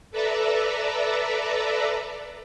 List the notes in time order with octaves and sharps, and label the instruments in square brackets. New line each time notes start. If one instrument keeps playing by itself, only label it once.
[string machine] A4 B4 D5 E5 A#5